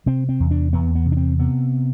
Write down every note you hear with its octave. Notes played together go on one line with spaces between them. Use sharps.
C3 C4
C4
E2
D4
E2 B3
B3
C3
D4
C4
C3 B3